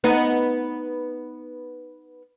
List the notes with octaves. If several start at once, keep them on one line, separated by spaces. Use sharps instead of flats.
B3 D#4